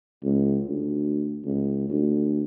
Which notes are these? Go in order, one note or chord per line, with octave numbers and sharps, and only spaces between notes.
C#2
D2
C#2
D2